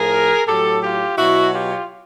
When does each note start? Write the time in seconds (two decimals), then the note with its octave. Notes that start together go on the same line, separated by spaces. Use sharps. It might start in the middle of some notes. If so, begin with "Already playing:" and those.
Already playing: A2 F3 G#4 A#4
0.47 A2 F#3 G4 A4
0.83 F4 G4
1.18 B2 F#3 E4 F#4
1.53 F4 G4